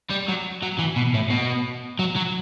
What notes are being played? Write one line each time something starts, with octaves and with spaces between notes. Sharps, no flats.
G3
F#3
F#3
E3
B2
A2
B2
F#3
F#3